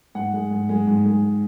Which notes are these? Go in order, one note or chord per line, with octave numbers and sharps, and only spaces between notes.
G#2 F#5
G#3
G#2
G#3
G#2
G#3